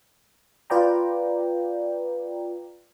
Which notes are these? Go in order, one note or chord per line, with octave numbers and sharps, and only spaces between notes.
F4 B4 D5 G5 A#5